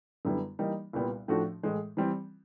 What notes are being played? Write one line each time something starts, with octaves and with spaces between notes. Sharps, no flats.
F#2 D3 G3 B3 E4
E3 G3 A#3 D#4
C2 A#2 G3 B3
A2 F3 A3 D4 F#4
A2 E3 G#3
E3 G3 C4